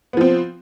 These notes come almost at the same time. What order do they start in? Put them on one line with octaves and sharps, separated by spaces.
B3 F3 C4